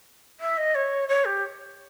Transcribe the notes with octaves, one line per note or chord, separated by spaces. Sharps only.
E5
D#5
C#5
C#5
G4